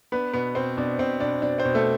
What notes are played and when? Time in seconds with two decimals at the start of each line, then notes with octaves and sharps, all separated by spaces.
0.12 B3 D4 B4
0.33 B2 B3 B4
0.55 B2 C4 C5
0.77 B2 D4 D5
0.99 B2 C4 C5
1.20 B2 D4 D5
1.42 B2 D4 D5
1.58 C4 C5
1.65 B2
1.75 A3 A4